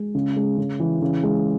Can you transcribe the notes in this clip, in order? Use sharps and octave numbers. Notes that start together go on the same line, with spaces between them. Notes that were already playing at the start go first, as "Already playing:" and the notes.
Already playing: G#3
C#3
G#3
C#3
E3
C#3
G#3